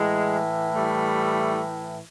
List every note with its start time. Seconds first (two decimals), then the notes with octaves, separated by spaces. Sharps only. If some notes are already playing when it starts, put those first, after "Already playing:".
Already playing: A2 E3 G#3
0.74 G3 A3